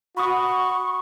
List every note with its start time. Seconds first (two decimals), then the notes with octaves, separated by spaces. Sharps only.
0.17 F#4 B5 C#6 D#6